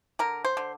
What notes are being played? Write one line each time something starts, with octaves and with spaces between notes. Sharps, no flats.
D3 A#4
C5
D3